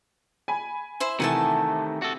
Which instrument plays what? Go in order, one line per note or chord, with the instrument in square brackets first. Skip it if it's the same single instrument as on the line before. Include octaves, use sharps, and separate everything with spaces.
[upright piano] G#5 B5
[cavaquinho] E4 C5 E5
[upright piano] C3 E3 [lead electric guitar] D#3 A3 [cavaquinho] F#5 G#5 A5
[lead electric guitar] F#4 A4